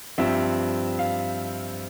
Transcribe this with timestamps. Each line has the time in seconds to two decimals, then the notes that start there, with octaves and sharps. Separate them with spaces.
0.18 G2 F3 C4 E5
0.99 F5